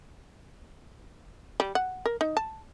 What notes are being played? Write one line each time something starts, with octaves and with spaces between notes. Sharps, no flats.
G3
F#5
A#4
D#4
A5